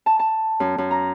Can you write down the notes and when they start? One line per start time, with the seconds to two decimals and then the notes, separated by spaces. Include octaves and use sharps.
0.06 A5
0.19 A5
0.60 F#2
0.78 F#2
0.91 A#5